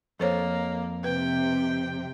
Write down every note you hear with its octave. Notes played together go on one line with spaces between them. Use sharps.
F2 A#3 A4 C5 C#5
C3 B4 G5